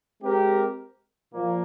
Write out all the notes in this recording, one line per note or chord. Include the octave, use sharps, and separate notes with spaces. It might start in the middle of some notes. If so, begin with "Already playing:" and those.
G#3 C4 G4 A#4
A#2 F3 A#3